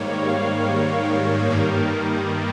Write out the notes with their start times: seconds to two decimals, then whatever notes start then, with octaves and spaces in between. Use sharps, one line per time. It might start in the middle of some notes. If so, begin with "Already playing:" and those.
Already playing: G#2 D#3 G3 A#3 C#5
0.28 F5
1.49 G2 D#3 G3 A#3